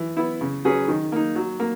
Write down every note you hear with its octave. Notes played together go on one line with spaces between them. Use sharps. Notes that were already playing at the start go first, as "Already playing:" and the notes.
Already playing: E3
B3 E4
C#3
F#3 C#4 G#4 B4
D#3
A#3 D#4
F#3
A#3